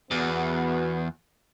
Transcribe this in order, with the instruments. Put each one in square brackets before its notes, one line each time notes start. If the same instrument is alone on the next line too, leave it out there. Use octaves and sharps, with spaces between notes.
[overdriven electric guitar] E2 [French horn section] B3 F#4